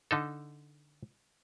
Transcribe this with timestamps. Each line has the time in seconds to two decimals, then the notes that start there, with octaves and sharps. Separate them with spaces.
0.11 D3 D#4 A4